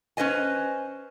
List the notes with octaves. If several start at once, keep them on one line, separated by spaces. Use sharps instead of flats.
C#4 B4 C5 D#5 G#5